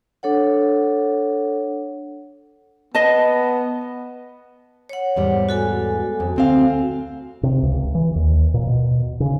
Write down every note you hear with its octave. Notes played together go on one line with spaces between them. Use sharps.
D4 A4 C#5 F#5
B3 D#5 A5
C#5 F#5
E2 G#2 G3
F#4 A4 G#5
F2
D2 C4 F5
C3
C#2
E3
D#2
A#2
B2
C#3